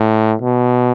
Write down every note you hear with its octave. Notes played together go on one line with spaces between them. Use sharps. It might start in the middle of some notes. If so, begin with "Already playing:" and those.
Already playing: A2
B2